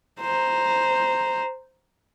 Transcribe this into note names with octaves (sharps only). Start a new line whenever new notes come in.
C5 A#5